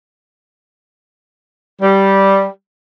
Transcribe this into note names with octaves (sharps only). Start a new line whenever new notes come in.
G3